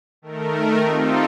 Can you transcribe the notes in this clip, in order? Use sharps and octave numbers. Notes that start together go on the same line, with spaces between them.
D#3 A3 A#4
C4 D#4 F4 G4 A4